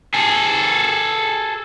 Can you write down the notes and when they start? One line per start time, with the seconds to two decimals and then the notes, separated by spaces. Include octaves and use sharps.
0.14 G#4 A4